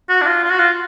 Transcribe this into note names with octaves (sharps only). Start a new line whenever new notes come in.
F#4
D4
F4
F4
F#4
F4